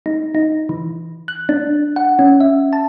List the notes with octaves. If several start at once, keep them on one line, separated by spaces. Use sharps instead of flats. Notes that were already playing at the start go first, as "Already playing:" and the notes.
D#4
D#4
E3
F#6
D4
F#5
C#4
E5
A5